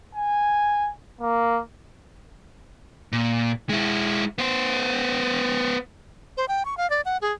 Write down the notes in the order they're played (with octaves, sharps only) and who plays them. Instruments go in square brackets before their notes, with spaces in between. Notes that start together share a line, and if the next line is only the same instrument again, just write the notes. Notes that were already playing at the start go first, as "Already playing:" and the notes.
[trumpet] G#5
A#3
[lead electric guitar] A#2
G#3 E4
B3 C5
[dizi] C5
G5
C#6
F5
D5
F#5
G#4